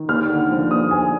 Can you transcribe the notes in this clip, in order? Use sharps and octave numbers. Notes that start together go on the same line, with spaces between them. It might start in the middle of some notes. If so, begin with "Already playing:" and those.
Already playing: D#3
D#2 F6
D3
F3
D#2 D#6
D#2 G#5